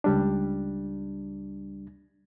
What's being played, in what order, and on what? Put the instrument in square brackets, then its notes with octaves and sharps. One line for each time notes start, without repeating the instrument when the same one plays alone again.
[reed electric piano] C#2 G3 D4